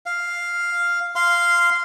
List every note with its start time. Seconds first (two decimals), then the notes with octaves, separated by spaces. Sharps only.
0.06 F5
1.16 F5 C6